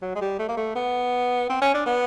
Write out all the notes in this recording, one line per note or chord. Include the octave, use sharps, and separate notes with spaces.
F#3
G#3
G3
A3
A#3
A3
B3
C4
C#4
D4
B3